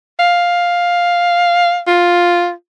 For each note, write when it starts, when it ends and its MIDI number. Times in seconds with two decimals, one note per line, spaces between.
0.19 1.80 77
1.87 2.52 65